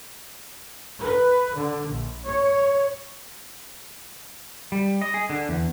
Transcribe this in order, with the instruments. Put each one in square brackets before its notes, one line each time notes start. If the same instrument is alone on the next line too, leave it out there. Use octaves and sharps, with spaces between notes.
[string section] B4
D3
A#1
C#5
[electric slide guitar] G3
D#5
G#4
D3
E2